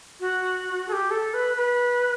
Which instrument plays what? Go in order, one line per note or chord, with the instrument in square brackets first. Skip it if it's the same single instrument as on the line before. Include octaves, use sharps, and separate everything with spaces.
[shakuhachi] F#4
A4
G4
A4
B4
B4